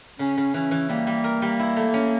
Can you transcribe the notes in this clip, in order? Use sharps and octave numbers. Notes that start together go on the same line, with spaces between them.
C#3 C#4
C#3
E3 C#4
E3
G3 A#3
G3
A#4
G3
E4
A3
C#4